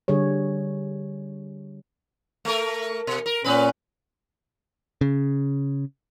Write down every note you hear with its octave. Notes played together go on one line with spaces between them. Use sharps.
D3 G3 G#4 C#5
A3 A#4
B2
A#4
A#2 B3 C#4 B4
C#3